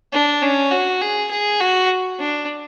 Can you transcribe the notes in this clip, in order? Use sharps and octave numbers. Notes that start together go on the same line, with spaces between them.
D4
C#4
F#4
G#4
G#4
F#4
D4